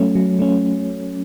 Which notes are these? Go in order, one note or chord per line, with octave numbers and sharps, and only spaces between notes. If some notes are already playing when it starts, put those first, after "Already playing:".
Already playing: F#3 A3 C#4
F#3
A3 C#4